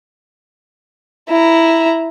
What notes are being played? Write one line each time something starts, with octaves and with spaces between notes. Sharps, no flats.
E4 A#5